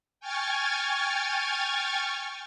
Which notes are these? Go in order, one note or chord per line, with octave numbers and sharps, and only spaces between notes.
G5 G#5 C#6 F6 G#6 A6